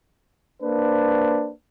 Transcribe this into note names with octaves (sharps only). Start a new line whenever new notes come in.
A#3 D4 B4 C5